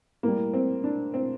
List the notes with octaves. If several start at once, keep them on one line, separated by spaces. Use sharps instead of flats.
A2 G3 A#3
C4
D4
C4